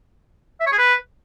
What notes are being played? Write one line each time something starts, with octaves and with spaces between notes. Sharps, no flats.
E5
C#5
G#4
B4